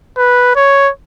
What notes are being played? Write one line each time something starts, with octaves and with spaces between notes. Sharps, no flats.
B4
C#5